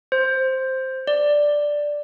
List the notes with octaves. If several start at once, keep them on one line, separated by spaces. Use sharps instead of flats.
C5
D5